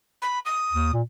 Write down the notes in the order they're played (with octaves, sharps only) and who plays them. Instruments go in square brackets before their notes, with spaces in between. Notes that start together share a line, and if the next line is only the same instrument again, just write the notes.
[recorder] B5
D#6
[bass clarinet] D#2
A#2